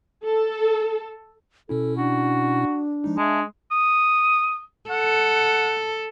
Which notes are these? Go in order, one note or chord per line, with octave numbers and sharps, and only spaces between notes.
A4
B2 C#4 E4 A4
D4 F#4
F3 G#3 D#4
G#3 E5 A5
D#6
A4 F#5